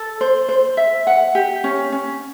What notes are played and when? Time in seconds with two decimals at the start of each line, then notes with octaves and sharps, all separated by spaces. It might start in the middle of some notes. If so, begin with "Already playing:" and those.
Already playing: A4
0.21 C5
0.49 C5
0.77 E5
1.07 F#5
1.35 G4
1.64 C#4
1.92 C#4